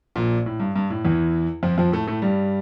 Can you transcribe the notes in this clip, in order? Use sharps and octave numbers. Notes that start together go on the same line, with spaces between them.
A#1 A#2
A2
G2
G2
A2
E2 E3
F2 F3
F2 F3
A2 A3
A2 A3
G2 G3